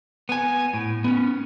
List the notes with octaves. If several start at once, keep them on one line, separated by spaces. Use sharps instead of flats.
B3 G#5
A2
B3 C#4